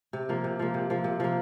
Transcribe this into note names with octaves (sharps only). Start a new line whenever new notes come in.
C3
F3 A#3
C3
F3 A#3
C3
F3 A#3
C3
F3 A#3